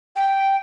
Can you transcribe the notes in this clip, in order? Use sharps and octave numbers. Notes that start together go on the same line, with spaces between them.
G5